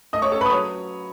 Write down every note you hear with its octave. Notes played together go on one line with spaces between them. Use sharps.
A3 D#5 D#6
C#5 C#6
C#4 A4 A5
B4 B5
D#6
F#3 C#5